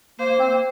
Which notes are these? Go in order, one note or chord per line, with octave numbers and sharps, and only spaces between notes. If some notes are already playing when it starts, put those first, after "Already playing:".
A#3 C5
A#3
C4
A#3